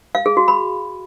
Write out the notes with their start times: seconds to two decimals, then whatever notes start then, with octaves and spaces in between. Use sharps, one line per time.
0.15 F5
0.26 G#4
0.37 F#4
0.48 B5